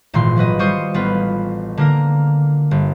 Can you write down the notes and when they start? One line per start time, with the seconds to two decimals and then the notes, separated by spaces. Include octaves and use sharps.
0.14 G#1 A#2 E3 C6
0.36 F3 F#3 B4 D#5
0.59 G3 F4 C5 C#6 D#6 C#7
0.94 A1 B3 F4 B4
1.77 D3 A#3 A#4
2.71 G1